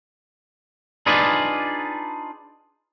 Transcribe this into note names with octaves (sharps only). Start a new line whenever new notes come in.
D4 D#4 F4 G#4 B4 D5